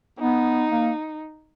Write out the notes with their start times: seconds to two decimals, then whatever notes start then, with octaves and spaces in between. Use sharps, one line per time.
0.19 B3 D#4
0.71 A#3